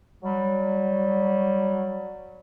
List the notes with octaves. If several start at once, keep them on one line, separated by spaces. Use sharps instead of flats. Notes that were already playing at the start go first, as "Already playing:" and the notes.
F#3 G3